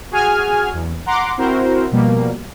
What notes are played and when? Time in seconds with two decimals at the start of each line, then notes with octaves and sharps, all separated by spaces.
0.11 F#4 G#4 G#5 F6
0.73 E2
1.06 F#5 A#5 C6 D6
1.37 C4 E4 F#4 A#4 C5
1.91 B2 F3 G3 A#3